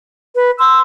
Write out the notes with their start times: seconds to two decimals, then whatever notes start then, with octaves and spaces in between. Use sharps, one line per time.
0.35 B4
0.59 C6 E6